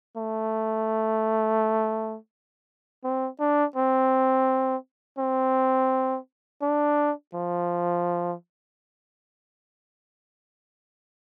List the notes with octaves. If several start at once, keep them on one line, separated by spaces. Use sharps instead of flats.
A3
C4
D4
C4
C4
D4
F3